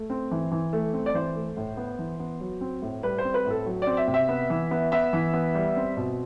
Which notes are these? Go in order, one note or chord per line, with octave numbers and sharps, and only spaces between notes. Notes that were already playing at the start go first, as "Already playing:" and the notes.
Already playing: A3
C4
E3
E3
A3
C4
D5
E3 C5
A3
A2
B3
E3
B3
F#3
C4
A2
G3 B4
C5
C4
B4
A2
A4
F#3
C4 D5
E5
C3
E5
B3
E3
B3
B3 E5
E3
B3
G3
C4
B2